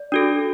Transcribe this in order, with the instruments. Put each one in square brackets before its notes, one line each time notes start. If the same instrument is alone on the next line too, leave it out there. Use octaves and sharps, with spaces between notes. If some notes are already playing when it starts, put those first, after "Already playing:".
Already playing: [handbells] D5
D4 F#4 A4